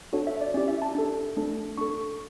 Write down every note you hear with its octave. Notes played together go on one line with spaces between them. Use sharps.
D4 F#4 A4 C#5
E5
D5
C#4 E4 G4 D5
E5
A5
D4 A4
A3 D4 A4
D4 A4 C#6